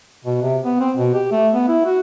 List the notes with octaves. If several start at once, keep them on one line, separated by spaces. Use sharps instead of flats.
B2
C3
B3
C4
B2
G4
A3
B3
E4
F#4